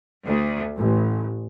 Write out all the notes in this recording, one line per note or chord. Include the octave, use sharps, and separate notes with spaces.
D2
A1